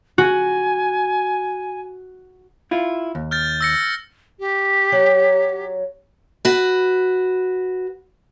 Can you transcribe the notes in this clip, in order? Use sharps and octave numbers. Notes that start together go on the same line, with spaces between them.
F#4 G#5
E4 F4
D#2
F6 G6 A6
E6 A#6 C#7
G4
F#3
F#4 B4